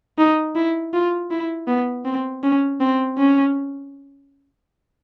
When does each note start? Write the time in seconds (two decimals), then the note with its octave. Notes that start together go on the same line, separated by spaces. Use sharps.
0.18 D#4
0.56 E4
0.93 F4
1.31 E4
1.68 B3
2.05 C4
2.43 C#4
2.81 C4
3.18 C#4